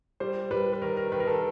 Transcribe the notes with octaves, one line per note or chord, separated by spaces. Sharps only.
G3 C5
G3 B4
B4
D#3 A#4
A#4
D#3 B4
A#4
A4